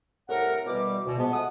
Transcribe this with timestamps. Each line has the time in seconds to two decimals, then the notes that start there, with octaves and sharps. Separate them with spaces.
0.29 C2 A2 A#4 F#5
0.66 B2 E3 G3 D6
1.05 D2 B2
1.17 F3 G#3 B3 A5
1.33 A3 F#5 D#6